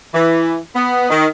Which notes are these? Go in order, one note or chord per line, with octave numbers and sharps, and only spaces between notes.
E3
B3
D#3